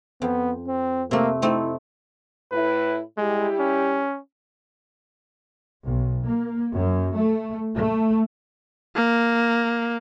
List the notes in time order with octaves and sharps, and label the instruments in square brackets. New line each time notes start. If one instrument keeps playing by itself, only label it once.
[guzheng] F2 [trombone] B3
[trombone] C4
[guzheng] C3 A3 [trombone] A#3
[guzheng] A3 C4 D#4 [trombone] E4
[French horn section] A2 E4 [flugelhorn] B4
[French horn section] G3 E4 G4 [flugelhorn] G#3
[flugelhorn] C#4
[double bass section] B1
A#3
F#2
A3
A3
[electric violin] A#3